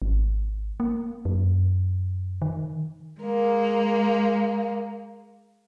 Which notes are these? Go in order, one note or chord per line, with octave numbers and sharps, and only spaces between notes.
G#1
A#3
F#2
D#3
G#3 A#3